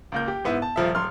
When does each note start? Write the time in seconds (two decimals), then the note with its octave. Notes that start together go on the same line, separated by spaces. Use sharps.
0.12 C#2 A#3 G6
0.28 G4
0.44 G#2 B3 E4
0.62 A5
0.76 D#1 F3 E5
0.95 D1 C6 F6